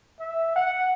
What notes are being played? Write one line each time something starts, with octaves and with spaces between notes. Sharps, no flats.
E5
F#5